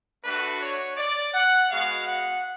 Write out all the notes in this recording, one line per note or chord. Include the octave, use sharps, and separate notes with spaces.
A3 D4 F#4 B4
C#5
D5
F#5
G#3 B3 F#4 F5
F#5